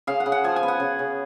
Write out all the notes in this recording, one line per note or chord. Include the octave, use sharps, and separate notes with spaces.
C#3 F5
F#5
C#3
F#5
F3 G#5
G#5
B3
F#5
C#3
C#3